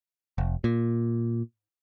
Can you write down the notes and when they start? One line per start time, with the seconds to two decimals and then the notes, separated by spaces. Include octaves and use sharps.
0.38 F1
0.64 A#2